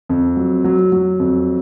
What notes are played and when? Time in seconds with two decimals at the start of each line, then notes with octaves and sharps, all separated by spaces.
0.09 F2
0.37 F#3
0.65 F#3
0.92 F#3
1.19 F2